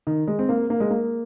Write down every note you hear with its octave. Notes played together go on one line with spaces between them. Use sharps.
D#3
G#3
C4
A#3
A#3
G#3
A#3